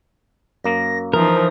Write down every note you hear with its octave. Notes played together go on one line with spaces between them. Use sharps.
F#2 A#3 A#6
E3 F3 D#4 A#4 C5 D#6